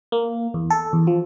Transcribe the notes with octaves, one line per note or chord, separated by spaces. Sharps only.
A#3
E2
A4
E2
F3